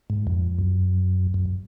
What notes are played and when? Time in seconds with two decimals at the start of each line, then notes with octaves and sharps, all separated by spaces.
0.10 G#2
0.27 F2
0.59 F#2
1.34 F#2